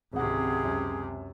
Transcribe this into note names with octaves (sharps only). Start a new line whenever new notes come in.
G#1 C#2 C3 G#4 F#5
F#2